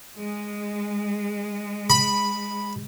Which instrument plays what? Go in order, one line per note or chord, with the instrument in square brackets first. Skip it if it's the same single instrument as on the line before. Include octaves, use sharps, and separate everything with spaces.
[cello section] G#3
[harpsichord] B5